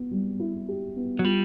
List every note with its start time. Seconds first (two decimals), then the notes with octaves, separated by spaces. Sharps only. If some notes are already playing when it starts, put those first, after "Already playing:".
Already playing: B3
0.11 G3
0.40 E4
0.68 G4
0.96 B3
1.19 F#3
1.25 G3 F4